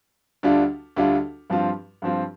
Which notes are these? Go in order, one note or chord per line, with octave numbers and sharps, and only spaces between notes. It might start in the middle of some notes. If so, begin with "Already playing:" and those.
D2 D3 G3 D4 F4
D2 D3 G3 D4 F4
G2 F3 C4 F4
G2 F3 C4 F4